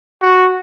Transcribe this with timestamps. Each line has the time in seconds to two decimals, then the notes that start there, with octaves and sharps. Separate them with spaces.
0.22 F#4